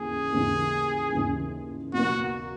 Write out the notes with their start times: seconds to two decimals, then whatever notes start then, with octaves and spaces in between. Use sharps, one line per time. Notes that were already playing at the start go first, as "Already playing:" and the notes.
Already playing: D#2 C#3 E3 G#4
0.33 D#2 C#3 E3
1.12 D#2 C#3 E3
1.93 B2 F#3 A#3 F#4